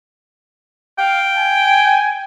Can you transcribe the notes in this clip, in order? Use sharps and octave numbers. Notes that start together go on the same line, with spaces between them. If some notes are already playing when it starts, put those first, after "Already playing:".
F5 G5
G#5